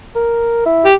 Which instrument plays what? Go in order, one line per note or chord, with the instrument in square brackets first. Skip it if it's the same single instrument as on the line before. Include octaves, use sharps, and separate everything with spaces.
[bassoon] A#4
E4
[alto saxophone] G4